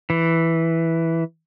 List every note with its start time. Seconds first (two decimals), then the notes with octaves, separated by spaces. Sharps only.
0.10 E3